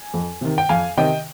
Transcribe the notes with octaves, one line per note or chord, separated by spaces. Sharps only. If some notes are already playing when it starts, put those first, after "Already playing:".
Already playing: G#5
F2
C3 D#3
G5
F2 F5 G#5
C3 D#3 D#5 G5